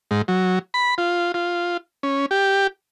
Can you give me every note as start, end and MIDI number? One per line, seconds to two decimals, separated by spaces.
0.11 0.22 44
0.28 0.59 54
0.74 0.95 83
0.98 1.32 65
1.34 1.77 65
2.03 2.26 61
2.31 2.67 67